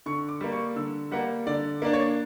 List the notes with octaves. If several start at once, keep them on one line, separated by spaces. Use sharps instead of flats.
D3 C#6
D6
G3 A#3
C#6
D3 E6
G3 A#3 F#5
D3 D5
A#3 D4 D5
C#5